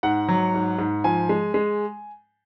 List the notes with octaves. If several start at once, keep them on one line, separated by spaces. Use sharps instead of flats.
G#2 F#5
F#3
G#2
G#2
F3 G#5
G#3
G#3